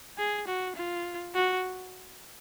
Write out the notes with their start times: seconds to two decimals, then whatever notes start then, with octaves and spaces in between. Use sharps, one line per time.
0.18 G#4
0.47 F#4
0.76 F4
1.34 F#4